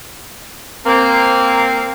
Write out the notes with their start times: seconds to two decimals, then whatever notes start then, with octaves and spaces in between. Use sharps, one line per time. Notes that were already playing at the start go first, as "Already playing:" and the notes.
0.85 A#3 C4